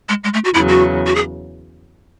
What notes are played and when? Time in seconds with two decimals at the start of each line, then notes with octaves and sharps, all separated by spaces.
0.09 G#3
0.24 G#3
0.34 A3
0.44 F#4
0.54 E2 C#3 F#3 E4
0.69 F#4
1.07 F#4
1.15 G#4